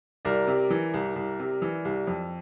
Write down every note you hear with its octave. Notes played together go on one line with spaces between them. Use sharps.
C2 A#4 D5
C3
E3
C2
C2
C3
E3
C2
F2